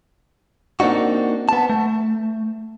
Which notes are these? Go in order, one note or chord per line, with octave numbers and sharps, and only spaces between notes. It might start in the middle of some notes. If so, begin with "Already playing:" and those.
A#3 C4 D4 D#4 F#4
B3 A5
A3